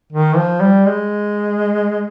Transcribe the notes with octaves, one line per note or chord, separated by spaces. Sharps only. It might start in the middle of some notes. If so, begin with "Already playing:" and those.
D#3
F3
G3
G#3